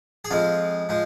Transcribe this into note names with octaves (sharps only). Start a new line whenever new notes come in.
G#4
F2 F3 G#3 F4
F3 G#3